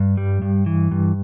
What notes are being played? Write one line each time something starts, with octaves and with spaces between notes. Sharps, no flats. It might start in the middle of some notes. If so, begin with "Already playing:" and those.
Already playing: G2
G3
G2
E3
G2